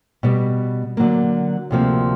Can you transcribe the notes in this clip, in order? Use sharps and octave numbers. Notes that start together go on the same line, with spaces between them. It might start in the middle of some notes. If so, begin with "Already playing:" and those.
B2 G3 B3
D3 F#3 A#3
D2 C3 F3 A#3